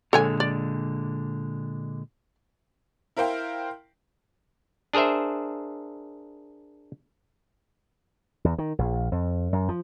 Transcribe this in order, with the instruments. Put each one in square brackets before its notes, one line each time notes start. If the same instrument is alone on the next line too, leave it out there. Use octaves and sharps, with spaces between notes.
[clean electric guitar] A#2 D3 G#3 [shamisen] A4 C#5 G#5
[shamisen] D5
[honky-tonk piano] E4 A#4 C5 F5 G5
[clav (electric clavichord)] D4 G#4 A#4 C5 E5
[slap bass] E2
D#3
A#1
F2
F#2
F3